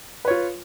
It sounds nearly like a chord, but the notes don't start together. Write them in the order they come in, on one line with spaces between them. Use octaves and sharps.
B4 C#5 F4